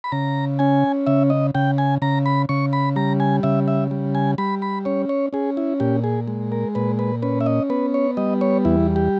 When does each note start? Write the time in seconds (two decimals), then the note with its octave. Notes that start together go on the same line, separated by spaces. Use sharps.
0.04 B5
0.12 C#3 A#5
0.59 C#4 G#5
1.06 C#3 E5
1.30 D#5
1.55 C#3 G5
1.78 G#5
2.02 C#3 A#5
2.26 B5
2.49 C#3 C#6
2.73 B5
2.96 G3 A#5
3.20 G#5
3.43 C#3 E5
3.68 E5
3.91 G3
4.15 G#5
4.38 G3 B5
4.62 B5
4.85 C#4 C#5
5.09 C#5
5.33 C#4 G#4
5.57 E4
5.80 A#2 G4
6.04 G#4
6.27 G#3
6.52 A#4
6.75 A#2 B4
6.99 B4
7.22 C#4 B4
7.41 E5
7.46 D#5
7.70 B3 B4
7.94 C#5
8.17 G3 D#5
8.41 C#5
8.65 E2 E4
8.96 G4